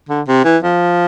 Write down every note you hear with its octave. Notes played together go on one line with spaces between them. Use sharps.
D3
C3
E3
F3